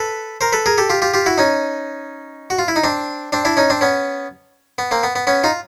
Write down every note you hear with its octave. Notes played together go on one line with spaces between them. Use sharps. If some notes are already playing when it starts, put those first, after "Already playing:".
Already playing: A4 B4
A#4 C5
A4 B4
G#4 A#4
G4 A4
F4 G4
F4 G4
F4 G4
E4 F#4
C#4 D#4
F#4
F4
E4
D#4
C4 D4
C4 D4
D4 E4
C#4 D#4
C4 D4
B3 C#4
B3
A#3 C4
B3
B3
B3 C#4
D#4 F4